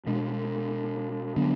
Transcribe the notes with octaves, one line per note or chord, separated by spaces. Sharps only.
B2 G#3 D4
D3 F#3 B3 D4